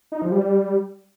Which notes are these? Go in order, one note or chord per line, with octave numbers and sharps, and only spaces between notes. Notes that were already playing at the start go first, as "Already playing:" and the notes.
D#4
F3
G3